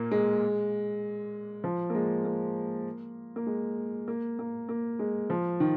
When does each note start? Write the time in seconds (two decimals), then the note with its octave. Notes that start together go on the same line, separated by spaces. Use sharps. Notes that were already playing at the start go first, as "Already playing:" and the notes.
Already playing: A#2 A#3
0.11 G#3
1.64 F3
1.90 A#3
1.94 G#3
2.25 A#3
3.36 A#3
3.47 G#3
4.08 A#3
4.39 A#3
4.69 A#3
4.99 G#3
5.30 F3
5.60 D#3